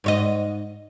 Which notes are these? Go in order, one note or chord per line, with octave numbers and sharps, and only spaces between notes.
G#2 C#5 D#5